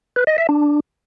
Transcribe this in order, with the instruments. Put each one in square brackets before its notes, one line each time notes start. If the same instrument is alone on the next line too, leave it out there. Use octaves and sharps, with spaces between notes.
[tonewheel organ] B4
D#5
E5
D4